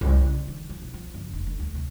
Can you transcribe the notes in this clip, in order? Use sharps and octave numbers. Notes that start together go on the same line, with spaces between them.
C2
C#3
D#3
F3
B1
F3
F#1
F1
D3
D2
C3